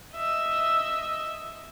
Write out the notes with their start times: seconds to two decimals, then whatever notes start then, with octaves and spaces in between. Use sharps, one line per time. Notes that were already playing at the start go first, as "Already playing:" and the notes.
0.16 D#5 E5